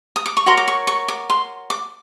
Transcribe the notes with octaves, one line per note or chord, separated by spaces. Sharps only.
D#6
D6
C#6
F#4 A#4 C#5 C6
D6
C#6
C#6
D6
C6
D6